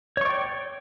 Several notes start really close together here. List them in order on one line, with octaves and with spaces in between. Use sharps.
C#5 C#6 D5 G5